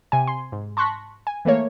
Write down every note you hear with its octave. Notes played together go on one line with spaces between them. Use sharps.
C3 G#5
C6
G#2
A5 C6 C#6 F#6 A#6 B6
G#5
E3 A3 A#3 C#5